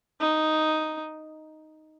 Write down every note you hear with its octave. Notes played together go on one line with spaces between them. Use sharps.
D#4